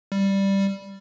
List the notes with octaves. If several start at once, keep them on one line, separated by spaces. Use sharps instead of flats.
G3